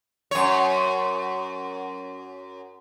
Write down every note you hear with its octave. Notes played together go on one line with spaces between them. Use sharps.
F#2 C#5